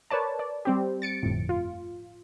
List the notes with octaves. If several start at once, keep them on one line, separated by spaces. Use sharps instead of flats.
A#4 B4 C#5 D5 A5
D5
G3 C4 G4
A6 C#7 D7
G1 F2 A2
F4